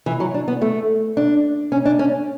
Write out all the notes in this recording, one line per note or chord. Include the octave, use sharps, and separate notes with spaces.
E3
F#3
D4
B3
A3
D4
C#4
D4
C#4